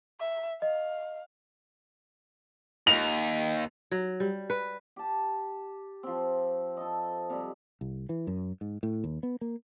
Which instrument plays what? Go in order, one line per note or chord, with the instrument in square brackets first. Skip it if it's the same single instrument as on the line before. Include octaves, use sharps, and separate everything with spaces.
[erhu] E5
[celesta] D#5 [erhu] F5
[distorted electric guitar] D#2 [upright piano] F7
[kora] F#3
G3
B4
[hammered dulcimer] G4 A5
F3 C4
A4 D#5
C3 G3 G#3
[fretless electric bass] C2
E3
F#2
G#2
A2
D#2
B3
A#3